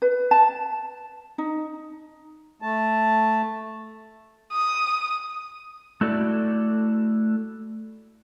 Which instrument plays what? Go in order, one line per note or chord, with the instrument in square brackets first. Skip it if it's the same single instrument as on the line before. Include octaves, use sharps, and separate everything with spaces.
[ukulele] B4
A5
D#4
[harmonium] A3 A5
[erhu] D#6
[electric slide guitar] A3 E4 F#4 A4 D5